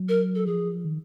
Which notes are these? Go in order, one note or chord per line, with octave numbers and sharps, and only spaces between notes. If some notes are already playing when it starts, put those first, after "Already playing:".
Already playing: F#3
A#4
A4
F3 G#4
D#3